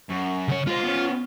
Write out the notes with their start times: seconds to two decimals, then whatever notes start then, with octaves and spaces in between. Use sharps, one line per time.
0.10 F#2
0.48 C#3 C#5
0.67 G#3 F4 C5
0.84 B3 C#4